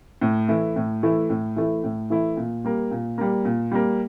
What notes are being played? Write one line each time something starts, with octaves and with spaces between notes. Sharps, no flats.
A2
E3 A3 E4
A2
E3 A3 E4
A2
E3 A3 E4
A2
E3 A3 E4
A#2
G3 A#3
A#2
G3 A#3
A#2
G3 A#3